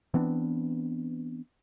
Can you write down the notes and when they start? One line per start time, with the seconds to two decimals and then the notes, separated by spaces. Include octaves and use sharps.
0.14 E3 B3 C4 D4